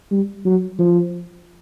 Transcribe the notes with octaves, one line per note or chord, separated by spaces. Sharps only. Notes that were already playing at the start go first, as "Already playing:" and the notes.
G3
F#3
F3